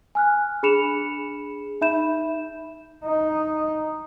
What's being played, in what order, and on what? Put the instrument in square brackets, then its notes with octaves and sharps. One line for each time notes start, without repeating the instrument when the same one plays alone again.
[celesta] G#5 F6 F#6
D4 G#4 B5 C#7 E7 F7
D#4 E5 B5 G6 E7
[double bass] D#4